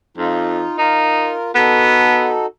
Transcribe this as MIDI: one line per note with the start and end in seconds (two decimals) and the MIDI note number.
0.17 0.62 41
0.17 0.77 63
0.17 0.77 65
0.78 1.33 63
0.78 1.51 65
0.78 1.51 70
1.55 2.34 59
1.55 2.46 63
1.55 2.46 66
1.55 2.46 69